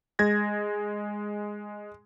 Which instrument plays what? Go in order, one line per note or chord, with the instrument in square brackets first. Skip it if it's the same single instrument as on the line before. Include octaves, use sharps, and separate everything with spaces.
[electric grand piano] G#3 G#6 A#6